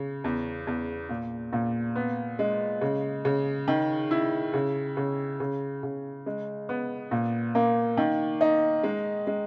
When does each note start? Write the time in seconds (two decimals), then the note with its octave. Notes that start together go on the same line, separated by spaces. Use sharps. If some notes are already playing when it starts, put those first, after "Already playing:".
Already playing: C#3
0.24 E2
0.67 E2
1.09 A#2
1.53 A#2
1.96 B3
2.39 G#3
2.81 C#3
3.25 C#3
3.68 D#3
4.11 E4
4.54 C#3
4.97 C#3
5.40 C#3
5.83 C#3
6.26 G#3
6.69 B3
7.11 A#2
7.55 A#3
7.97 D#3
8.41 D#4
8.83 G#3
9.27 G#3